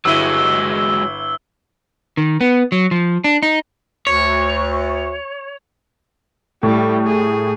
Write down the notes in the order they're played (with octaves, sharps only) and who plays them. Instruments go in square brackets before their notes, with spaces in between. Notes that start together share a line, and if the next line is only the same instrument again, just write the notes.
[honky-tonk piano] G1 E4 D#7 [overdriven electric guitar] F#3 G#3 [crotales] E6 G7
[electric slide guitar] D#3
B3
F#3
F3
D4
D#4
[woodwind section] D2 [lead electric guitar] C#5
[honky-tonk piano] A2 [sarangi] G3
[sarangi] G#4